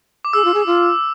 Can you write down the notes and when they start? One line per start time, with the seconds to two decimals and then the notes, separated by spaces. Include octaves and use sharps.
0.25 D6
0.33 G#4 E6
0.45 F4
0.54 G#4
0.66 F4